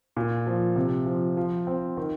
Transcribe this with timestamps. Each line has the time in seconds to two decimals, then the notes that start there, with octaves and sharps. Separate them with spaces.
0.16 A#2
0.47 F3
0.76 C3
1.06 F3
1.37 F3
1.67 C4
1.97 D#3